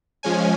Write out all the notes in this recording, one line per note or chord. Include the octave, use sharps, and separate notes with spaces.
F3 G#3 C#4 G#5